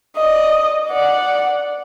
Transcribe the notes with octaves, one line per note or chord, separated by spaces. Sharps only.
D5 D#5
D5 F#5